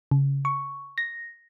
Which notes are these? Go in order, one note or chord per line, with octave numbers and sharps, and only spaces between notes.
C#3
C#6
A#6